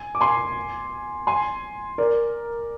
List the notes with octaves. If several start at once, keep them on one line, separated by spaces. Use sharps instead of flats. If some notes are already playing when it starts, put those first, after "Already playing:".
Already playing: G#5
D6
G#5 C6
G#5 C6
A#4 D5